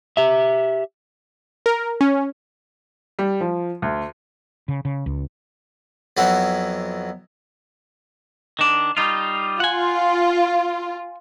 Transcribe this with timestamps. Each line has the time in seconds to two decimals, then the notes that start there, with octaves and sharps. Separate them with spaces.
0.17 G4 E5
1.66 A#4
2.01 C#4
3.19 G3
3.41 F3
3.82 D2
4.68 C#3
4.85 C#3
5.06 C#2
6.17 F2 F#3 B3 E4 F#5
8.59 D#3 D4
8.97 G3 D#4 F4
9.60 F4 F#5 G#5